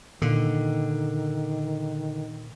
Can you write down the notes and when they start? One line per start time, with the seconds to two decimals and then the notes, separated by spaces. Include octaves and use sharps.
0.22 A#2 D3 D#3